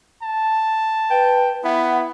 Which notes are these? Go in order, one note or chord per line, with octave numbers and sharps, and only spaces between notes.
A5
B4 G5
B3 E4 F#5